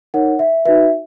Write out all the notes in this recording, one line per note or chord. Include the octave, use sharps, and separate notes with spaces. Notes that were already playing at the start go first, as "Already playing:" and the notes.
D#4 A#4 C#5 F#5
E5
D#4 F#4 B4 E5